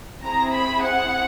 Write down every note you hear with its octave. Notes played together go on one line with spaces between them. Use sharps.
C4 E4 G#4 A#5
B5
F#5